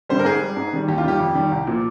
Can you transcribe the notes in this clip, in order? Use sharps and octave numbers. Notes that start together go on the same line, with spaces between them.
D3 G3 C5
A#4
G#2 G#4
G3
G#2
D#3 G3
D#2 G4
F4
D#3 G3 G4
F2
D#3 G3
C2
A#2 F3